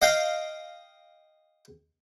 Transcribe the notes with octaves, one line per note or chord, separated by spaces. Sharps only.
D#5 F5 G5